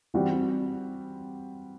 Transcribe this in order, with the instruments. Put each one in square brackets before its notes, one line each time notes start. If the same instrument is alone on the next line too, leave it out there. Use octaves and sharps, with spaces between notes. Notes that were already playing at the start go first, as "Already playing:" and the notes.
[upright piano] E3 G3 C4 F#4